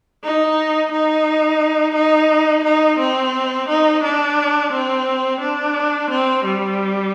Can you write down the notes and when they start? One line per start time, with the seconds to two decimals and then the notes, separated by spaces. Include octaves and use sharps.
0.23 D#4
0.91 D#4
1.95 D#4
2.64 D#4
2.99 C4
3.69 D#4
4.03 D4
4.73 C4
5.41 D4
6.10 C4
6.45 G3